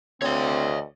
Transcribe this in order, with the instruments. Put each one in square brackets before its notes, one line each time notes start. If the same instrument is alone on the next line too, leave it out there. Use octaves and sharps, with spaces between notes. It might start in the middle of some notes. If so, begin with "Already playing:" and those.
[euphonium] D2 [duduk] C4 [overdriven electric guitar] C#5 D#5